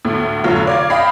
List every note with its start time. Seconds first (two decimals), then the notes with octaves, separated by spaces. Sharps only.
0.05 D2 A2
0.44 F1 D3 F#3 F4 C#5
0.67 D5 F5 G#6
0.90 D#5 F5 G5 B5 C7